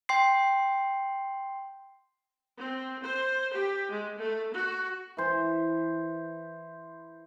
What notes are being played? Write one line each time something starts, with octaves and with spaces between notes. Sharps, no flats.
G5 C6 C7
C4
C5
G4
G#3
A3
F#4
E3 C5